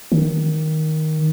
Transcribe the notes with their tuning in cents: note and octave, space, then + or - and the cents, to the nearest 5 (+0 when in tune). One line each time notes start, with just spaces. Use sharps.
D#3 +5